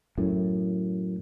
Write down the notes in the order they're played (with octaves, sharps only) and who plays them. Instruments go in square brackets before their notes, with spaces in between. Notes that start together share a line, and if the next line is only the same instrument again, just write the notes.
[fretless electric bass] F#2 A2